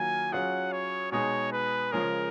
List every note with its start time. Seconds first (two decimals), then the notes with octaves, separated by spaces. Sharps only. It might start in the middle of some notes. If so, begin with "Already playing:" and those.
Already playing: D#3 F#3 A#3 F4 G#5
0.32 F#3 C#4 F4 G#4 F#5
0.73 C#5
1.12 B2 G#3 D#4 G#4 C#5
1.53 B4
1.92 C#3 F3 G#3 C#4 G#4 A#4